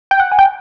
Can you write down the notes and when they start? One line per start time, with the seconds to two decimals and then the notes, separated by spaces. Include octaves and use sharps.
0.11 G5
0.20 F#5
0.32 G#5
0.39 G5